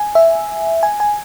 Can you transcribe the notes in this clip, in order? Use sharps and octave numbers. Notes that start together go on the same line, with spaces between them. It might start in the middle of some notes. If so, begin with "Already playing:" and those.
Already playing: G#5
E5
G#5
G#5